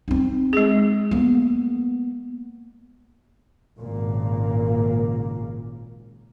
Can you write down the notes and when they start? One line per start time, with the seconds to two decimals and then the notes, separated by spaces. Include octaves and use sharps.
0.08 C4 D#4
0.53 G#3 G#4
1.11 A#3 B3
3.80 G#1 A#2 C#3 A#3